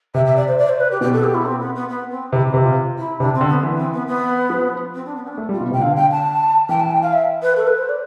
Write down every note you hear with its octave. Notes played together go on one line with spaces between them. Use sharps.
C3 E5
E5
D5
C5
D5
C5
B4
G4
B2 G4
A4
G4
E4
C4
B3
B3
B3
C4
C3 E4
G4
C3
F4
E4
C3 D4
C4
D3
B3
E3
C4
B3
B3
F3
C4
D4
B3
D4
A3
G3
F4
B2
C3 G5
D3 F5
G5
A5
E3 G5
A5
G5
F5
E5
B4
A4
B4
C5
D5